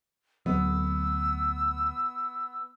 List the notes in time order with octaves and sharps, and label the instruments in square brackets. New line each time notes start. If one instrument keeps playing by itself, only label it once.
[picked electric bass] D2 F#3 [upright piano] B3 [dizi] E6